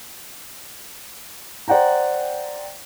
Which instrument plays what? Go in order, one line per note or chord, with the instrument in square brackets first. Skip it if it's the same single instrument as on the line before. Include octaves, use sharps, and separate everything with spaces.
[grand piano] C5 D5 F#5 G5 A#5